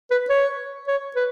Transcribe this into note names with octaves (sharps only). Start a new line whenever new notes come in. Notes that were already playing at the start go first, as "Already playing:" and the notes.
B4
C#5
C#5
B4